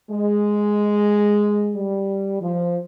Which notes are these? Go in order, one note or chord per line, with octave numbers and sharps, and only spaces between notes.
G#3
G3
F3